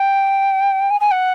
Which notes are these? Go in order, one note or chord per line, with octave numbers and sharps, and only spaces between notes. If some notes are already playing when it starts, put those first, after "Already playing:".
Already playing: G5
G#5
G#5
F#5